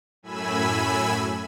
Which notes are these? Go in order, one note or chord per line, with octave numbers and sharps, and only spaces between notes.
F#2 A2 G#5 B5 E6